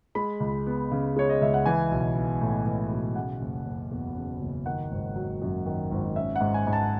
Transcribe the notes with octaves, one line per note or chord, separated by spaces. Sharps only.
G#3 B5
C#2
B3
C#3
G#3 C#5
D#5
C#2 E5
F#5
E3 G#5
B1
B3
A2
E3
B1
C#3 F#5
F#1
F#1
E2
C#3
F#1
D#3 F#5
G#1
F#3
F#2
D#3
G#1
C#4 E5
F#5
G#2
G#5
G#2
A5